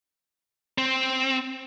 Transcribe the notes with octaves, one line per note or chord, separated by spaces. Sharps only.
C4